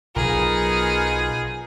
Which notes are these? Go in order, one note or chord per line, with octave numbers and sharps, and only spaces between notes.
B1 F#3 B3 D#4 F4 G#4 A#4